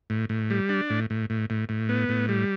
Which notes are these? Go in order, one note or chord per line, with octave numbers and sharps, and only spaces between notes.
A2
A2
G3
D4
A2
A2
A2
A2
A2
B3
A2
G3